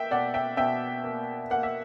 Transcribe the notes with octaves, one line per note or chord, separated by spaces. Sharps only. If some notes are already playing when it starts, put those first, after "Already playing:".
Already playing: A#3 E5 G5
B2 D5 F#5
E5 G5
B2 E5 G5
A#3
A#3 F#5
E5